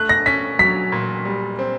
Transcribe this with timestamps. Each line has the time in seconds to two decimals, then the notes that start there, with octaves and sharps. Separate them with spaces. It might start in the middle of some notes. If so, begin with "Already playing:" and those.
Already playing: A3 F#6
0.09 A#6
0.26 C#4 B6
0.59 F#3 B6
0.92 A#2
1.25 G3
1.59 C4